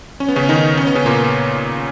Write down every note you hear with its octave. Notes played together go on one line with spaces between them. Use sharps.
C#4
B3
C#3 C#4
D#3 D#4
C#4
B3
C#3 C#4
A#2 A#3